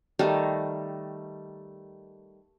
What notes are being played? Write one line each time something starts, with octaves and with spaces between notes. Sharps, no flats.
D#3 G3 A3 D#4